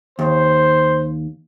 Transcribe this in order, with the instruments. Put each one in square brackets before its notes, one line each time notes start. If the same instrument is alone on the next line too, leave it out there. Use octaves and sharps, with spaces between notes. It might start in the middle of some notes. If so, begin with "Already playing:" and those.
[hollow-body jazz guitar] D#2 [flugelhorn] C5